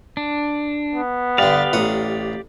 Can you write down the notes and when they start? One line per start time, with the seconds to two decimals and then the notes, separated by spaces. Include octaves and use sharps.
0.17 D4
0.94 B3
1.38 G2 D3 G4 D5 F5
1.73 A1 F#5 D#6